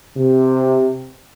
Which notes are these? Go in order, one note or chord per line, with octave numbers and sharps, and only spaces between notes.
C3